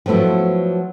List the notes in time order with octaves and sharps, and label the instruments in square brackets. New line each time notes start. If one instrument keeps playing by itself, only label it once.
[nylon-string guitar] F3 F#3 A3 B3 E4